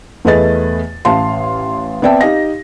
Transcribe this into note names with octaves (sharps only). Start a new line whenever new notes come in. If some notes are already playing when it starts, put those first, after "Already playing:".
E2 A3 G#4 B4 D#5 A6
A1 F5 A5 C6
B3 C4 D5 E5 G5 A5
D#4 G4 D#5 F5 A#6